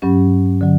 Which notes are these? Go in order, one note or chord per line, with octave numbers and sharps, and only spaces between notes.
G2 F#3 C#4 G4
D3 F#3